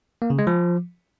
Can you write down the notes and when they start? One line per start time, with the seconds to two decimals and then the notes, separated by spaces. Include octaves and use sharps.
0.22 A#3
0.30 C#3
0.39 G#3
0.47 F3